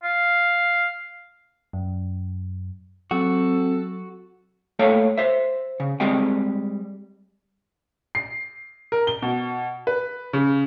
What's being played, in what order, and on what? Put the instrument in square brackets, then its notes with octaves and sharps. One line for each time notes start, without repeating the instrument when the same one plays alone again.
[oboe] F5
[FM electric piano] F#2
[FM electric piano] F#3 [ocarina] C4 [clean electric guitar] F#4 [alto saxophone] A4
[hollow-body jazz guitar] A3 A#3 A4 C#5 F5 G5
C5 E5
C#3
G3 G#3 C4 D#5 G5
[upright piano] C7
A#4
G7
B2
B4
C#3